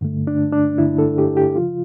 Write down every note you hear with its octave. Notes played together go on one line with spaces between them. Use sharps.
G2 D3 A3
D4
D4
G2 D3 A3 E4
A4
G4
G4
C#3 F3 F4